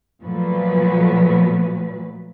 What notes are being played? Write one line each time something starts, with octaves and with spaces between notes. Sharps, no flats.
A#2 F3 F#3 A3 B4